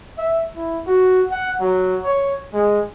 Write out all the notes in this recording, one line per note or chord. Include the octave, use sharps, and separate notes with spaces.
E5
E4
F#4
F#5
F#3
C#5
G#3